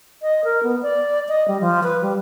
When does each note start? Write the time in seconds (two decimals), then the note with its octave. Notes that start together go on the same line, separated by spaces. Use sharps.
0.22 D#5
0.45 A#4
0.63 B3
0.82 D5
1.28 D#5
1.48 G3
1.61 F3
1.83 B4
2.02 G3